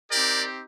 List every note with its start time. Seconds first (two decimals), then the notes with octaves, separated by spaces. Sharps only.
0.12 C4 D#4 G4 A#4 D5